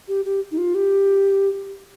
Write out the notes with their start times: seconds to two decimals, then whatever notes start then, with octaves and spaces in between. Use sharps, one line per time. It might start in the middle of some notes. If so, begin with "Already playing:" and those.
0.08 G4
0.25 G4
0.52 D#4
0.58 F4
0.75 G4